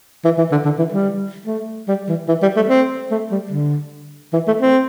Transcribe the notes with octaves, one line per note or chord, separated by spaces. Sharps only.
E3
E3
D3
D3
E3
G3
A3
G3
E3
E3
G3
A3
C4
A3
G3
D3
E3
A3
C4